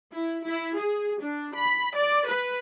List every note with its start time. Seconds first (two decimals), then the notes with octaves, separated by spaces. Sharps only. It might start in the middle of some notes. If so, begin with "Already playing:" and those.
0.13 E4
0.45 E4
0.77 G#4
1.20 D4
1.55 B5
1.94 D5
2.27 B4